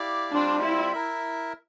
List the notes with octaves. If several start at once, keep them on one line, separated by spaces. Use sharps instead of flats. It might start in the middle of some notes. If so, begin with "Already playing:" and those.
Already playing: E4 G4 D5 F5
G3 C4 D4 F4
E4
E4 A#4 E5